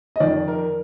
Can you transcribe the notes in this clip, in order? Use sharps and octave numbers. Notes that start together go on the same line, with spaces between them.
D#5
F2 D#3 D5
A#4